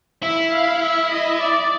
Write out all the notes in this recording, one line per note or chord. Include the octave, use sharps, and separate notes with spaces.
E4 E5
F5
E5
D#5
D5